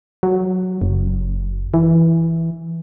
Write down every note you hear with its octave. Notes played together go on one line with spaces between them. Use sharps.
F#3
F#1
E3